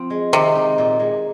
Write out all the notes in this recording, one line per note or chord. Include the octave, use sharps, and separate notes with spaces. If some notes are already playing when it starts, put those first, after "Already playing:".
Already playing: F3 C4
G#3
C3 D#3
D#4
A#2
G#3